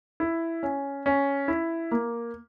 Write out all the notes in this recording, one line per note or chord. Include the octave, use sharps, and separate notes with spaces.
E4
C#4
C#4
E4
A#3